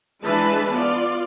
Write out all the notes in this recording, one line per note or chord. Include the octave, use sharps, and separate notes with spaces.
E3 G#3 D4 B4 A5
B3 F4 D5